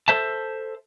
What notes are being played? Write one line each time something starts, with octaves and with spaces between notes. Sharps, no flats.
A4 C5 E5 A5